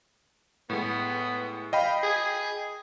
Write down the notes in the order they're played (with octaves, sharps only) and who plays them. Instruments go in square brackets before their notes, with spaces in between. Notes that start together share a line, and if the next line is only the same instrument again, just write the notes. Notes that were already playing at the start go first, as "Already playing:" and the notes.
[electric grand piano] A2 G#3 [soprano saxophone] B3
[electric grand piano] D#5 G5 B5 [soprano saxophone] F5
[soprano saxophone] G#4